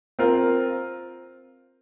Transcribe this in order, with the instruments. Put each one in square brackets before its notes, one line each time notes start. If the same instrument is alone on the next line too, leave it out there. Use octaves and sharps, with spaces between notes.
[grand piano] C4 F4 A#4